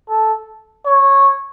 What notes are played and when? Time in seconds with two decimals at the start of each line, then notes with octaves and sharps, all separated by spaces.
0.09 A4
0.85 C#5